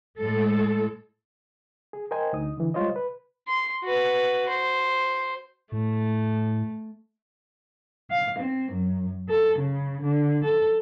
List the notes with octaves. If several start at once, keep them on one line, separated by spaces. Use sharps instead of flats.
A2 G#3 A4
G#4
A#4 C5 D#5 G5 G#5
D2 D#4 D#6
D3 E3
G3 G#3 F4 C5 C#5 D#5
B4
C6
F#4 B4
C5
A2 A3
F5
C4
F#2
A4
C#3
D3
A4